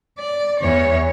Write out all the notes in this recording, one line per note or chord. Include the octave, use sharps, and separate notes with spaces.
D5
E2 C#5